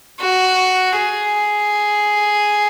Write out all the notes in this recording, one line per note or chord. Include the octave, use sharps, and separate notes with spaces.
F#4
G#4